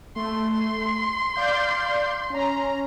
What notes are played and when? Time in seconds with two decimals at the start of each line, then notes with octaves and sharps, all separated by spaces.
0.16 A3 C6
1.36 D5 F5 G6
2.30 C#4 A#5